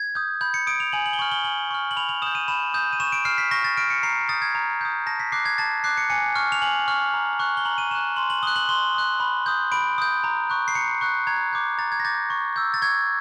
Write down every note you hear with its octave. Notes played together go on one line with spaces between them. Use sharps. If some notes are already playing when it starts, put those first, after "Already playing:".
Already playing: G#6
D#6 G6
B5 G6
C#7
D#6 G6 D7
F7
G#5 F#7
F#7
G7
C#6 F6 F#7
G7
G#5 F#7
C#6 F6
F#7
B5 F7
F7
D#6 G6 E7
D#7
B5 E7
D#6 G6
D#7
C#6 E7
D7
F6 C7
B6
C#6 A#6
A6
F6 D7
C#7
A#5 C7
D#6 G6 A6
G#6
A#5
D#6 G6
A5 A#6
B6
D6 F#6 C7
G#6
A5 A6
D6 F#6 C7
C#7
G#5 C#7
C#6 F6
F7
G#5 F#7
C#6 F6
A#5
C#6 F#6
G7
A#5 F#7
D#7
C#6 F#6 E7
C6 F#7
F#7
D#6 F#6 G7
F#7
C6 G7
D#6 F#6
B5
D#6 G6
B5 D7
D#6 G6
A#5
C#6 F#6
C7
A#5 C#7
C#6 F#6
A#5 G#6
D6 G6
A#5 A6
G#6
A#6
D6 G6 A6
C#6
E6 G6
A6
C#6 G#6